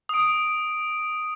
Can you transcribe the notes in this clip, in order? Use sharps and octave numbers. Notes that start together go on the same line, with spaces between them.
D#6 D7